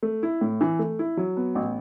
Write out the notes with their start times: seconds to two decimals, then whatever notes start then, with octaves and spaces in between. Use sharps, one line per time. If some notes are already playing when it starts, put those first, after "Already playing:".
0.03 A3
0.23 E4
0.41 A2
0.61 E3
0.79 A3
0.99 E4
1.17 F#3
1.37 B3
1.55 A1